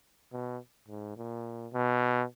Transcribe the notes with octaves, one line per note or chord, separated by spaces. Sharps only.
B2
G#2
A#2
B2